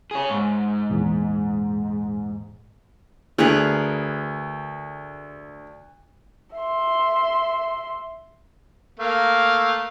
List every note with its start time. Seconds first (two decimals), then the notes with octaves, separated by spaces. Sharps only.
0.11 G#4 C#5
0.29 G#2
0.90 E2 A#2
3.38 D2 G#4 A#4 B4
6.56 E5 C6
9.00 A3 A#3 F5